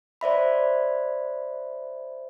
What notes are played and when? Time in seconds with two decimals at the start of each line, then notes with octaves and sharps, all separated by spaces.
0.21 C5 D5 E5 B5